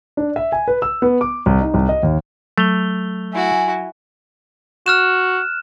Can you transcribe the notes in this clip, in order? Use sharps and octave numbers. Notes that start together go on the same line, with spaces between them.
D4
E5
G#5
B4
E6
B3
D6
C2
D#4
C2
D#5
D#2
F#3 A3 F7 G7
E4 F#4 G#5
F#4 F6 F#6 E7